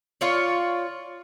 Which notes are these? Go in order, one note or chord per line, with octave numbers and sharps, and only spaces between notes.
F4 C#5 D5